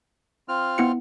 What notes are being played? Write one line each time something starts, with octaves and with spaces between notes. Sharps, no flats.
C4 F4 F6
B3 E4 C#7